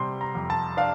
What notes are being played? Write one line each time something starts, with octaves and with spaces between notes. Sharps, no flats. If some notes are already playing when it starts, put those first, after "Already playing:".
Already playing: C3 G3 C6
A#5
F2
A5
D4 F5